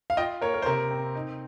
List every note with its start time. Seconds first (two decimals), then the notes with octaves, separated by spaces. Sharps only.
0.10 F5
0.17 F4 D#5 G5
0.41 A#3 A#4 C#5
0.54 A#4
0.62 C5
0.66 C3 A#4
0.91 C4
1.15 D#4